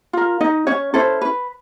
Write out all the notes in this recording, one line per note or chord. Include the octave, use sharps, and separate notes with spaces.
F4 A#4
D#4 D#5
C#4 C#5
C#4 E4 A4 C5
B4